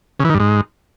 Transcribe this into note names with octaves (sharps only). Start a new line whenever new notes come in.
C#3
E3
D#3
G2
G#2